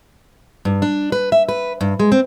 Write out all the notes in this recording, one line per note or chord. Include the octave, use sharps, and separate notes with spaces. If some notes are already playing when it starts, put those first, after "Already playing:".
G2
D4
B4
E5
B4
G2
G#3
C4